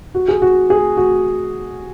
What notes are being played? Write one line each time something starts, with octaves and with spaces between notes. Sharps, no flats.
F#4
G#4
F#4
G#4
F#4